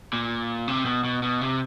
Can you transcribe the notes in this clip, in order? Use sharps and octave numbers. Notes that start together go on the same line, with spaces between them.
A#2
C3
B2
B2
B2
C3